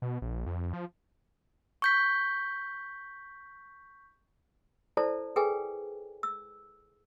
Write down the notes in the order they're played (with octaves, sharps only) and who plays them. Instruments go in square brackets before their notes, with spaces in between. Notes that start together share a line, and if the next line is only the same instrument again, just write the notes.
[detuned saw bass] B2
A#1
F2
F3
[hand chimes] C#6 G6 B6
[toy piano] E4 A4 C5 D5 A5
G#4 A4 B4 G5 G#5
E6